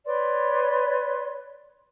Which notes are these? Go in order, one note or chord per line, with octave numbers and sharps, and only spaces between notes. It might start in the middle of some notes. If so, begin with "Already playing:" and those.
B4 C#5 D5 C6